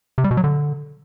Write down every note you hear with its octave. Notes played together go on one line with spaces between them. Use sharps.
C3
G3
B2
F#3
D3